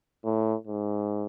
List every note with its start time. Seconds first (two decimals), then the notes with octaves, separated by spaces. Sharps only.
0.25 A2
0.68 G#2